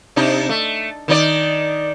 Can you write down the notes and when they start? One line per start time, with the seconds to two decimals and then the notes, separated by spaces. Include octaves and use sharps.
0.16 C3 D4 D#4
0.49 A3
1.08 D#3 D#4 D5